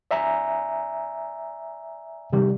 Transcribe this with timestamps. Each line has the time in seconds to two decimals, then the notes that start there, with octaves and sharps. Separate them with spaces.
0.11 D5 E5 G#5 A#5
2.33 C3 D#3 G3 G4